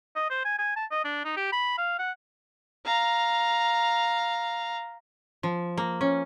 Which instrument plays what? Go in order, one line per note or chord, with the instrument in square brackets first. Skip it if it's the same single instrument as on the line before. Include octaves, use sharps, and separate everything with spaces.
[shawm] D#5
C5
G#5
G#5
A5
D#5
D4
D#4
G4
B5
F5
F#5
[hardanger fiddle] F5 A#5
[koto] F3
A#3
C#4